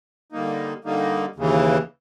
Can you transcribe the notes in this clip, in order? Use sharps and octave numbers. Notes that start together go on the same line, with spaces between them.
D3 G3 A#3 D#4
D3 G3 A#3 D#4
D#2 C#3 E3